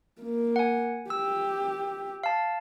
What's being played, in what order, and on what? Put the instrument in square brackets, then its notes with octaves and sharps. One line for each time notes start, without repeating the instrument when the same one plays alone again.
[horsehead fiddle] A#3
[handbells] F#5 G#5
[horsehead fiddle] G4 [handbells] E6
[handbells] F5 A5